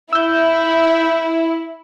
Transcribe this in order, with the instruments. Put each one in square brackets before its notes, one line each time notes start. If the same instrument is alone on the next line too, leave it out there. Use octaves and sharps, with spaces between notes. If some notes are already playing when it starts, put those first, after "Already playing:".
[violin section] E4 [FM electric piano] E6 G6